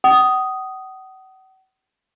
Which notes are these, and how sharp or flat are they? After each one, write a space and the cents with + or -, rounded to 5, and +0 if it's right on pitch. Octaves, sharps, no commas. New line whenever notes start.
F#5 +40 D#6 +0